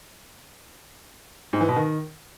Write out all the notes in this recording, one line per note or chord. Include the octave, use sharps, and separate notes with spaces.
G#2
E3
B2
D#3